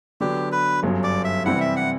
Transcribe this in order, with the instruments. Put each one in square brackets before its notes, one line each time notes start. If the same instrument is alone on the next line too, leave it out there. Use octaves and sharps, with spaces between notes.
[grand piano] D3 F#3 B3 D4 [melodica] G4
[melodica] B4
[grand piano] G1 F#2 F#3
[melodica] D5
E5
[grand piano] C3 E3 G3 C4 E4 [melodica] F#5
[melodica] E5
F#5